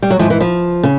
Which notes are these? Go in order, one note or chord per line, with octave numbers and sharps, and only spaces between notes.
G3
F#3
G#2 E3 F3
E3
F3
C#3